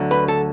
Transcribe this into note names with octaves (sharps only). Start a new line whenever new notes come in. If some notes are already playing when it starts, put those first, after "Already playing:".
Already playing: D2 D3 F#3
B4
A4